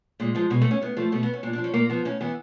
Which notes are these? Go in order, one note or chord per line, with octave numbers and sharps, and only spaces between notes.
A#2 G#3
F3 G#3
B2 G#3
A3
C#4
A2 B3
F3 A3
B2 A3
B3
C#4
A#2 D4
D4
F3
C#4
A#2 A#3
F3 B3
A2 C#4
E3 B3